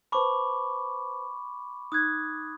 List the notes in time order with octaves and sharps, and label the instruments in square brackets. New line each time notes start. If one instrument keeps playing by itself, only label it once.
[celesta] B4 C5 A5 [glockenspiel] B5 C#6 D6
[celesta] D#4 F#6 G#6 [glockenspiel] D#6